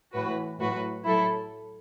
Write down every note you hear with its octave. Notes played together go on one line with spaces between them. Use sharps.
A2 E3 F#4 B4
A2 F#3 F#4 B4
A2 F#3 E4 A4